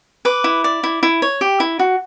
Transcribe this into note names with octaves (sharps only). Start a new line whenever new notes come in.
B4 D6
E4
D5
E4
E4
C#5
G4
E4
F#4